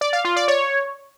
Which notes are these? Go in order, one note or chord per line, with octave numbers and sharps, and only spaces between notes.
D5
F5
F4
D5
C#5